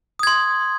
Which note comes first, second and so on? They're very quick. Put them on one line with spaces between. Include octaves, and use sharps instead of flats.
D#6 G#6 C6